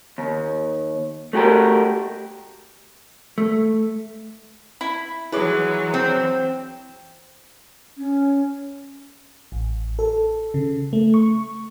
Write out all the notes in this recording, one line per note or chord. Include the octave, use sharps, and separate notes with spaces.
D#2
A3 F#4 G4 A#4
A3
E4 B5
E3 F#3 G#3 E4 G#4 B4 C#5 D6
C4
C#4
A1
A4
C#3
A3
C#6